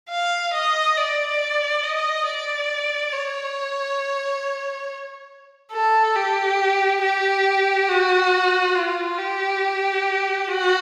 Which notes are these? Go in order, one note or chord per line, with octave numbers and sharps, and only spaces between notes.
F5
D#5
D5
D#5
D5
C#5
A4
G4
G4
F#4
F4
G4
F#4